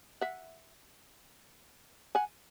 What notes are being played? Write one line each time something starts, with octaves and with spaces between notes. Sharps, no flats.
E5 F#5
F#5 G#5